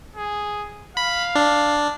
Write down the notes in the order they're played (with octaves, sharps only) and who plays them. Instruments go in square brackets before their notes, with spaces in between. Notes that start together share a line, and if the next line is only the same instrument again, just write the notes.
[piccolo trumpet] G#4
[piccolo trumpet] F5 [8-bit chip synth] B5
[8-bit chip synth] D4